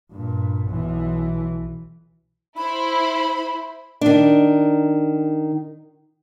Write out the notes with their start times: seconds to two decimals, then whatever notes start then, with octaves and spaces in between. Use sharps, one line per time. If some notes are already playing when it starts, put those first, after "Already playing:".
0.12 G2 A#2
0.67 B1 E3
2.57 E4 C5 B5
4.01 D#3 D4